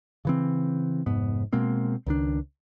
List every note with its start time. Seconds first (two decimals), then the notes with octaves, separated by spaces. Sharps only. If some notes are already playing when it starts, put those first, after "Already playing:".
0.25 C#3 E3 C4
1.06 F1 G#2 B3
1.53 B2 G#3 A#3 C4
2.06 C#2 D#3 D4